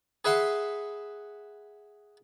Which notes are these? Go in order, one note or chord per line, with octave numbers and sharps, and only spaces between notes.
G#4 B4 E5 F#5 C6